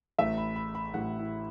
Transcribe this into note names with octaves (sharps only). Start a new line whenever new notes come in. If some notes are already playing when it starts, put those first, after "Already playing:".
A1 A2 A3 E5
B5
B5
B5
A1 A2 A3 F#5
E4